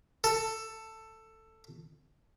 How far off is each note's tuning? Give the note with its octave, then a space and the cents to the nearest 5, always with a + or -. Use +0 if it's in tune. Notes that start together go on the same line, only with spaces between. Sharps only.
A4 +10